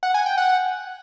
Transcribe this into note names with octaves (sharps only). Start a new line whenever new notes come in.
F#5
G#5
G5
F#5